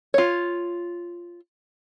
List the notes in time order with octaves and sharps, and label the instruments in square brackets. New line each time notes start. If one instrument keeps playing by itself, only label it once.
[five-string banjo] F4 C#5